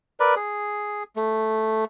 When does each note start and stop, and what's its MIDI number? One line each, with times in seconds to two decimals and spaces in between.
0.20 0.35 70
0.20 0.35 71
0.20 0.35 74
0.36 1.03 68
1.16 1.84 57